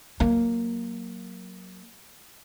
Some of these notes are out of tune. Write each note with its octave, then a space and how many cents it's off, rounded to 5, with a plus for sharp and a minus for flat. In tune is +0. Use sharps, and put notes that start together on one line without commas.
F#3 +0 A#3 +0